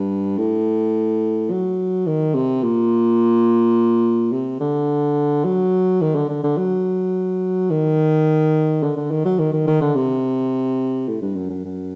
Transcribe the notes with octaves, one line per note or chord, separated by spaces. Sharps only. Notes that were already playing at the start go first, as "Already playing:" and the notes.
Already playing: G2
A2
F#3
D#3
C3
A#2
C3
D3
F#3
D#3
D3
D3
D3
F#3
D#3
D3
D3
D#3
F#3
D#3
D#3
D#3
D3
C3
A2
G2
F#2
F#2
F#2